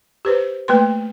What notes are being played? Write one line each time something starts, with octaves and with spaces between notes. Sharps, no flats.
G4 B4 C5
A3 A#3 B4 C6